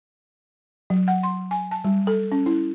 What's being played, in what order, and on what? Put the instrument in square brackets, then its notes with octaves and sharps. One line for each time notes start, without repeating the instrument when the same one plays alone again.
[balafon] F#3
F#5
C6
G#5
A5
G3
A4
C#4
E4